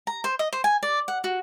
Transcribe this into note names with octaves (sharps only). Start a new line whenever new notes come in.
A#5
C5
D#5
C5
G#5
D5
F#5
F#4